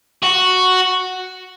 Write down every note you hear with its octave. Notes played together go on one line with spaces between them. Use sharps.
F#4